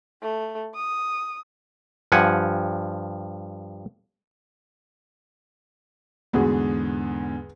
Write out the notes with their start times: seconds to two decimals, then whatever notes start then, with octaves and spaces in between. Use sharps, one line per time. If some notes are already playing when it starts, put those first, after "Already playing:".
0.22 A3
0.75 D#6
2.12 G2 F3 F#5 G#5
6.33 E2 G#2 D3 B3 F#4 G#4